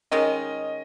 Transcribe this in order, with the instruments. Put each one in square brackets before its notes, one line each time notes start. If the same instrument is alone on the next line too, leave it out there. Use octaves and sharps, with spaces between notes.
[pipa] D#3 G#3 C#4 [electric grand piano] D#5